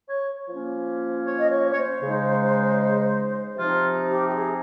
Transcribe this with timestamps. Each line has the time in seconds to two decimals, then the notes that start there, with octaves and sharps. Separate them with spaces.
0.10 C#5
0.49 F3 A#3 C#4
1.26 C#5
1.39 D#5
1.51 C#5
1.72 C#5
1.78 C5
2.02 C#3 G#3 D#4
3.57 C3 F3 C4 D#4 F4
4.09 G4
4.29 G4
4.35 G#4